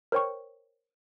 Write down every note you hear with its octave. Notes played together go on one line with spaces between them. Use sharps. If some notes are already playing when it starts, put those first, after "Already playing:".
A#4 C5 C#5 G5 C#6